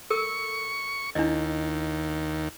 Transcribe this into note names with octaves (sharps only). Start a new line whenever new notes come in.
A4 A#4 C#6 E6
D#2 D4 E4 D#5